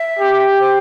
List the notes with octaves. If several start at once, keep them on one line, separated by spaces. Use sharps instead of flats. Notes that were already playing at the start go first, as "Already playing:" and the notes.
Already playing: E5
G4
C5